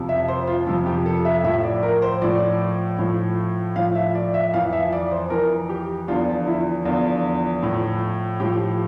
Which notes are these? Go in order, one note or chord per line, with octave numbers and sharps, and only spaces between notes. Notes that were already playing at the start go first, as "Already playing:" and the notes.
Already playing: F2 C3 F3
E5
C5
F4
F2 C3 F3 F4
G4
A4
E5
A2 F3 E5
D5
A#4
C5
A2 F3 D5
A2 F3
A2 F3 F5
E5
D5
E5
F2 E3 F5
E5
D5
C5
F2 E3 A#4
G4
E2 D3 F3 F4
E4
E2 D3 F3 F4
A2 F3
A2 F3 G4